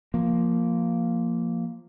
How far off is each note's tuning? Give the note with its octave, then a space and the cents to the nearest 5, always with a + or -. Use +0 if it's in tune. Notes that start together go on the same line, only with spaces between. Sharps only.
F3 +0 A#3 +0